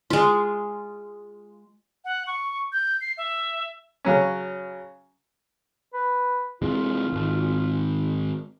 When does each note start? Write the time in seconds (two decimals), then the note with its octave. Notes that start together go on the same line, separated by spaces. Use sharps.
0.10 G#3 F4
2.05 F#5
2.27 C#6
2.73 G6
3.01 C7
3.18 E5
4.05 C#3 F#3 C#4
5.94 B4
6.62 C3 E3 G#3 F4
7.13 G#1